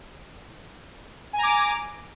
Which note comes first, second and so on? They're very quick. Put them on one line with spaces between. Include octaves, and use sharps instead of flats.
G#5 A#5 D6